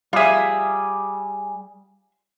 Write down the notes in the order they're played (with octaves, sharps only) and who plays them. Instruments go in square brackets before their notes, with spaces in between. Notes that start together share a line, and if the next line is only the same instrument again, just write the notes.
[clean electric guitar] G3 G#4 [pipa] F4 E5